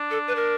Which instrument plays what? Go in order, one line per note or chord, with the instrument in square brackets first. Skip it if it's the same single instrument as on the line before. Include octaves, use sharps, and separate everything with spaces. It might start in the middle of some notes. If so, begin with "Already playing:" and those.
Already playing: [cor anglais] D4
[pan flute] A4
B4
A#4